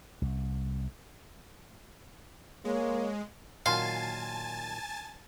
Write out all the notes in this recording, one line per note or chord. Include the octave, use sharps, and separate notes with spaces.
C2
G#3 A#3 C#5
A#2 D#3 F#3 F5 G#5 A5 C6 A6